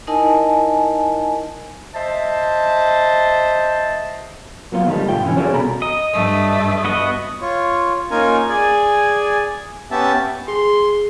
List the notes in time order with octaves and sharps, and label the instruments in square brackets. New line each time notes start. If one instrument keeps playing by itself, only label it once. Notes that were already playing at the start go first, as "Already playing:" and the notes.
[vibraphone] D#4 E4 A#4 D#5 G#5 A5
[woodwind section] C5 D#5 E5 A5
[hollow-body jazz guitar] F#3 A#3 B3 F4
D#3 F3 G3 A3
G2 B2 A3 F4 G5
D3 E3 C#4
C#4 F#4 G#4 A4 C#5 D5
C2 B2 A4 A#4 A#5 B5
[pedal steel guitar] D#5
[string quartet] G2 A3
[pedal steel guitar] B3 F#4 D#5
[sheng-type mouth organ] F4 C#5
A#3 C#4 D#4 F4 A#4 G#5
G#4 D5 G#5
B3 C#4 G4 E5 A5
[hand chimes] G#4 [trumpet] C6